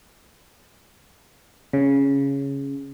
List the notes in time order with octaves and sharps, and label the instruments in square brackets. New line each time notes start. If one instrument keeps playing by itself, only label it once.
[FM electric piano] C#3